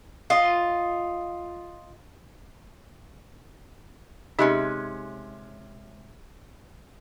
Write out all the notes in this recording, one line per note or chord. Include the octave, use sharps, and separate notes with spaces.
F4 D#5
C3 G#3 C#4 D#4 G4 D#5